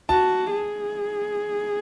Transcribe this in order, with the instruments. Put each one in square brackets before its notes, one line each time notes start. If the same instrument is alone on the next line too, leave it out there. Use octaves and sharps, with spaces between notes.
[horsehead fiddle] F#4 [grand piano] A5
[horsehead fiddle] G#4